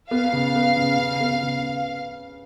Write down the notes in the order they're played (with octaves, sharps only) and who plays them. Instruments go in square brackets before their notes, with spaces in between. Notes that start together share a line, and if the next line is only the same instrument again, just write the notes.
[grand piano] B3 [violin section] F5
[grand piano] C#3
B3
C#3
C#3
B3
C#3